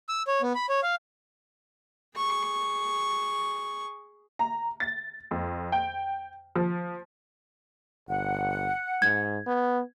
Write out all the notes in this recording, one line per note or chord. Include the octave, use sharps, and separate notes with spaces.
E6
C#5
B3
B5
C#5
F5
G#4 C#6
A#5
A6
F2
G5
F3
G1 F#5
G#2 G#6
B3